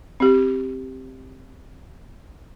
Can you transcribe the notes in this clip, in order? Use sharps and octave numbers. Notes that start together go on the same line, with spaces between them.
C4 G4